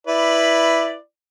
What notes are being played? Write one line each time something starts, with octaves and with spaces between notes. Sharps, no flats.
E4 B4 D5